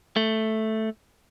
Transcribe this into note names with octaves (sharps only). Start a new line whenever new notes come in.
A3